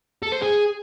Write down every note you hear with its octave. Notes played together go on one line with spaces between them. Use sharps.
A4
C5
G#4